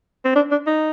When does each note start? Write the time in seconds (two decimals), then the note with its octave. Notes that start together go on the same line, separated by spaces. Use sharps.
0.25 C4
0.36 D4
0.51 D4
0.67 D#4